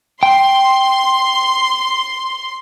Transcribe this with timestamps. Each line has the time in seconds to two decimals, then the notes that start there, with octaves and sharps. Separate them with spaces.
0.23 G5 C6